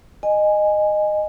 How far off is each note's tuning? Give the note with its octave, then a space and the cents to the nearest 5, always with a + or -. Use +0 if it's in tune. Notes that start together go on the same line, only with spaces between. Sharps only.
D#5 -15 G#5 +0